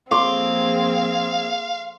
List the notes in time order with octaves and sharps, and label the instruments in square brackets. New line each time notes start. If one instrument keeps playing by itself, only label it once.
[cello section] F3 A#3 G#4 [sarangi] C4 [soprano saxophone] F5 [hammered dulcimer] C6 D6